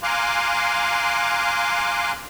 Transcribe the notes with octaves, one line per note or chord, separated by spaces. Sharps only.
F5 G#5 A#5 C6 D6 F#6